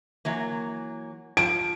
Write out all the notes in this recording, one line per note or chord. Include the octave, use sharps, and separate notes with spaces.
E3 F#3 A#3
F3 A5 D7